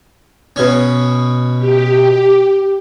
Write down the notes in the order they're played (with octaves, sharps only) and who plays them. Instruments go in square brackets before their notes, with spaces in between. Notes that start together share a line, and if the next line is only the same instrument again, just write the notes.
[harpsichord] B2 C#4
[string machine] G4